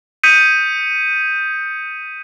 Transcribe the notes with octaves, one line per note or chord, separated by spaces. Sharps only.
D#6 G6 B6 C#7 D#7